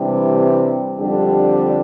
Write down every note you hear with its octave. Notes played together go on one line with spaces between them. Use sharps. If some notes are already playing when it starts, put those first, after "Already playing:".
Already playing: C3 E3 G3 D4 G4
F2 D3 G3 D4 G4